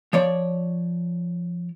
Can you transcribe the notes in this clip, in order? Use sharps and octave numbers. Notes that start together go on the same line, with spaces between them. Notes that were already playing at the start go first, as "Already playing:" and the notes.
F3 C#5 D5